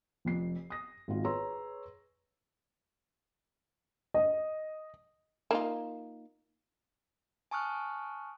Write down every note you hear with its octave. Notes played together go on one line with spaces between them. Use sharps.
F1 F2 C7
D#6 A#6
G#1 G#2 F4
G#4 B4 C#5 A#5 C6 E6
D#5
A#3 D#4 F4
G#5 A5 C#6 D#6 F6 F#6